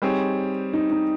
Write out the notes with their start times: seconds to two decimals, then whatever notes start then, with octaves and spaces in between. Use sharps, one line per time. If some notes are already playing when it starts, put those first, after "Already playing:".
0.02 G3 C4 D#4 G4 G#4 C#5
0.73 D#4
0.91 D#4